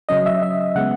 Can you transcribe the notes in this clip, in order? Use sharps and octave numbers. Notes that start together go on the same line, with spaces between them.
C#3 F#3 C#4 D#5
E5
E5
C#3 G#3 B3 F#5